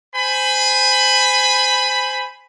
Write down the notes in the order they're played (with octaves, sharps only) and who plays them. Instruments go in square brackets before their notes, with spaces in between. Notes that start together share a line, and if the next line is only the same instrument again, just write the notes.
[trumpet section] C5 G#5 B5